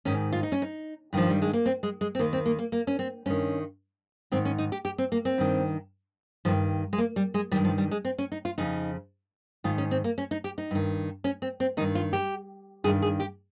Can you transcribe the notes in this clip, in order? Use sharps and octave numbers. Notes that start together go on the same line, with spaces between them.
G#2 D#3 C#4
F4
D#4
C#4
D#4
G2 D#3 F3
G3
G#3
A#3
C4
G#3
G#3
C4
D#2 D#3 A#3
C4
A#3
A#3
A#3
C#4
C4
G2 D#3 C#4
G#2 D#3 C4
C#4
D#4
G4
G4
C4
A#3
C4
G2 D#3
G2 D#3 F3
G#3
A#3
G3
G#3
G2 D#3 G3
F3
G3
G#3
C4
C#4
D#4
F4
F2 C#3 D#4
G#2 D#3 F4
C#4
C4
A#3
C#4
D#4
G4
D#4
G2 D#3
C#4
C4
C4
G2 D#3 D#4
F4
G4
G2 D#3 G#4
G#4
G4